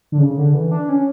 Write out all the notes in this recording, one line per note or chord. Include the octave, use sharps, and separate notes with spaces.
D3
C#3
D3
E3
D4
C#4